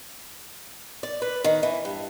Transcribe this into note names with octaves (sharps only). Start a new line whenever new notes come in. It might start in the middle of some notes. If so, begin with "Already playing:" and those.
D5
B4
D#3
E3
G2